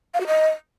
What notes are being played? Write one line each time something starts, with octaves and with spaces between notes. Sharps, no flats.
F5
F#4
D#5